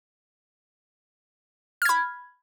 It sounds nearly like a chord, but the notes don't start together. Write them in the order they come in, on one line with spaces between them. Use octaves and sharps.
F6 G#6 B5